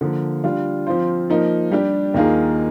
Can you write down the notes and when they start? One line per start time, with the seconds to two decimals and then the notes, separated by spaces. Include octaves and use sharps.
0.01 D3 F3 A#3
0.44 G3 D4 F4
0.87 F3 C4 F4 C5
1.30 F3 A#3 D#4 A#4
1.71 G3 D4 G4
2.14 D#2 D#3 A#3 F4 G#4